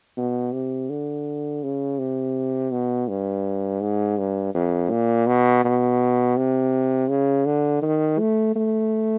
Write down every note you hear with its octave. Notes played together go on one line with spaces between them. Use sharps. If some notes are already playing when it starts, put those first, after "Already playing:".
B2
C3
D3
C#3
C3
B2
G2
G#2
G2
F2
A#2
B2
B2
C3
C#3
D3
D#3
A3
A3